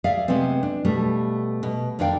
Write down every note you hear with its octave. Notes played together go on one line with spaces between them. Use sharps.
G#4 D5 E5 F5
C3 G#3 A3 B3 C4
D4
B2 G3 A3
B2
F2 D#3 D4 D5 F5 G5